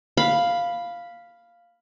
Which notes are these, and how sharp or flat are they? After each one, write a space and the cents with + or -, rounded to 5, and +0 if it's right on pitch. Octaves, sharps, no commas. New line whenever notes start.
F5 +0 B5 +0